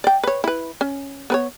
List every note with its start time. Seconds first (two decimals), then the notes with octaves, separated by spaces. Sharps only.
0.04 D5 G5
0.24 B4 C#5
0.44 E4 B4
0.81 C#4
1.30 B3 B4 C#5